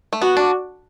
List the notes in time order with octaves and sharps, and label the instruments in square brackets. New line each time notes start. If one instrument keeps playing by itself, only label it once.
[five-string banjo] A3
[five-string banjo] B3 [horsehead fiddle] F#4
[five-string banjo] D4